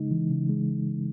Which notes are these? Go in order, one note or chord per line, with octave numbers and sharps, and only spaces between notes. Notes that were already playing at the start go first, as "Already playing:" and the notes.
Already playing: C#3 G#3 D#4
E3
C#3
G#3